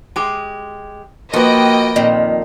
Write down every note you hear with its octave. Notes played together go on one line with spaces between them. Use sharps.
G#3 G4
F3 A#3 F#4 B4 D#5 G5
F2 A#2 D#3